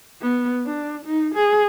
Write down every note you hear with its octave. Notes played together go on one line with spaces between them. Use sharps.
B3
D4
D#4
G#4